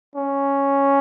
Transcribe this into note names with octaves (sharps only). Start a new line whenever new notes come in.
C#4